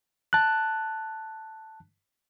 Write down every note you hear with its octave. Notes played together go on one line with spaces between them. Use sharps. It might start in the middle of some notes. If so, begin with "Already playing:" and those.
A5 F#6